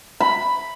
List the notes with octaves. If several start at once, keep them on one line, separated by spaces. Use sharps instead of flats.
B5